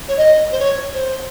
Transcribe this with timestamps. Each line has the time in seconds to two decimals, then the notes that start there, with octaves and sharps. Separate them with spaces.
0.08 C#5
0.17 D#5
0.52 C5
0.59 C#5
0.93 C5